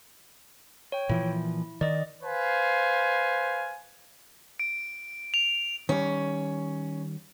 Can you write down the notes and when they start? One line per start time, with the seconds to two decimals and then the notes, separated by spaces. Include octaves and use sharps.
0.92 C#5 G5
1.09 A#2 E3 F3 E4
1.81 D#3 D5 D#5
2.23 B4 C5 F5 G#5
4.60 D7
5.34 F7
5.89 D#3 G3 C#4